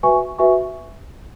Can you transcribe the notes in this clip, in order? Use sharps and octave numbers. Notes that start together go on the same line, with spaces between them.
F#4 B4 E5 G#5 C#6
F#4 B4 E5 G#5 C#6